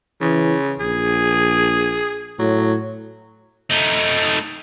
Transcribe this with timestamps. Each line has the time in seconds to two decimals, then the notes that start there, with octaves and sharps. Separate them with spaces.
0.21 C#3 E3
0.80 A#1 G#4
2.39 A2 F#3
3.70 A3 D#4